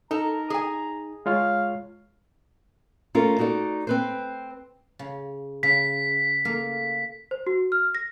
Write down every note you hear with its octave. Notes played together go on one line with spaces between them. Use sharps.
D#4 A4 A#4 A#5
G#4 G#5
G#3 F4 C#5 F5
A3 C#4 F4 A4 A#4
D#4 F#4 A4 D5
C4 B4 C5
C#3
C#3 B6
A#3 A4 F5
C5
F#4
F6
A#6